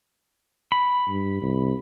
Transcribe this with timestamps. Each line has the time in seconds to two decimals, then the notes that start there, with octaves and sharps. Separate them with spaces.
0.72 B5
1.08 G2
1.42 C2